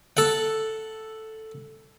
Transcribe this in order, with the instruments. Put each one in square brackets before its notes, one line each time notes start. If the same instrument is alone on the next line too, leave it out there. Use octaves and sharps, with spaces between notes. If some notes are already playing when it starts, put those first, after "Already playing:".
[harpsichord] A4 F#5